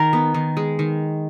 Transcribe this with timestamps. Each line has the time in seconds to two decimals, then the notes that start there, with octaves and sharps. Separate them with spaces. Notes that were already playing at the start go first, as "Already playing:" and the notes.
Already playing: D#3 A#4
0.13 B3
0.34 D#3
0.57 G#3
0.79 D#3